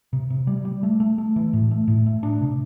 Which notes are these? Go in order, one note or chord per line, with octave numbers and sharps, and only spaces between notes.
C3
C3
G3
G3
A3
A3
A3
E3
A2
A3
A2
A3
D4
C3